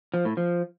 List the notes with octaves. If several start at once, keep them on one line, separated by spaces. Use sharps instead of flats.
F3
A2
F3